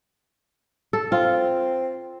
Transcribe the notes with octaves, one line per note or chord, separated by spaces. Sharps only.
A4
C4 F4